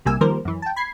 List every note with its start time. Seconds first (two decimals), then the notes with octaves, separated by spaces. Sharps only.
0.05 B1 C3 G3 A#3 G#5 E6
0.21 D#3 F3 G3 A#3 A#4 C5
0.45 F#2 E3
0.62 G5 A5
0.76 B5 G#6 C7